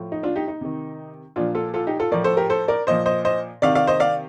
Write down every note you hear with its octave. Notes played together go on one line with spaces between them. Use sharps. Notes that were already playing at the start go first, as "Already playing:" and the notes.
Already playing: A2 F3
D#4
D4 F4
D#4 G4
D#4
C3 D#3
A#2 F3 D4 F4
F4 A4
F4 A4
D#4 G4
F4 A4
A2 F3 A#4 D5
A4 C5
G4 A#4
A4 C5
A#4 D5
A#2 F3 C5 D#5
C5 D#5
C5 D#5
C3 D#3 D5 F5
D5 F5
C5 D#5
D5 F5